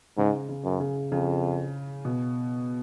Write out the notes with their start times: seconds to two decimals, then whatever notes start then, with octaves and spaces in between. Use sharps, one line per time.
0.17 G#2 C#3
0.49 C#3
0.64 F#2
0.80 C#3
1.11 F2 C#3
2.05 B2